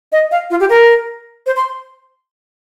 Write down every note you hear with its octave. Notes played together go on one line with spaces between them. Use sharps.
D#5
F5
F4
G4
A#4
C5
C6